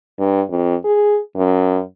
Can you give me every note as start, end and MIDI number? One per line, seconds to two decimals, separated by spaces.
0.19 0.42 43
0.49 0.75 41
0.85 1.19 68
1.36 1.81 42